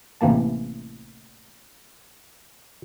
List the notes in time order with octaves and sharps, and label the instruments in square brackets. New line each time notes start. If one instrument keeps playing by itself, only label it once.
[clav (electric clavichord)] A1 C3 E3 A#3 A5